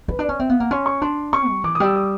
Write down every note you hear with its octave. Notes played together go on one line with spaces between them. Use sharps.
C#4 B4
D4
C#4 D5
C4 E5
B3 F5
A#3 F#5
C#4 C6
C#6
D4 C6
C#4 C#6
G3
E3 D6
D#6
G3 E6
D#6